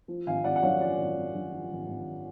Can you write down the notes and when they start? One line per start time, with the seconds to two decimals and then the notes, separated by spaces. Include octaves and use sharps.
0.08 F3
0.27 G#1 F5 G#5
0.44 G#1 D5 F#5
0.56 F#5
0.63 F#2 C#5 F5
0.81 F3 D5
0.98 G#1
1.16 G#1
1.35 F#2
1.53 F3
1.71 G#1
1.88 G#1